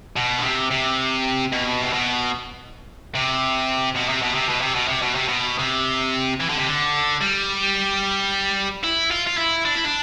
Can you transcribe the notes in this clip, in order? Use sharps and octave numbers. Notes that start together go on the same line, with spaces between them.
B2
D3
C3
C3
B2
C3
B2
C3
B2
C3
B2
C3
B2
C3
B2
C3
B2
C3
B2
C3
E3
D3
C3
D3
G3
E4
F4
F4
E4
D4
E4
D4